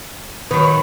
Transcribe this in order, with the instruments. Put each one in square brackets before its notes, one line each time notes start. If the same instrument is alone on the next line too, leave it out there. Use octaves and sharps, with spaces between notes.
[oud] D#3 F#3 [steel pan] B4